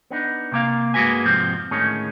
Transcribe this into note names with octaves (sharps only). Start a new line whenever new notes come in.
B3 D4 D#4
C3 A#3 F5
G2 G#3 A#3 F#4 B4 G#5
F2 G#2 C3 F3 C4
D2 A2 D#3 G#3 C#4